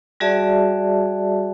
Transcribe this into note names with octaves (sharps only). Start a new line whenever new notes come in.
G3 F#4 G#4 D5 E5 A5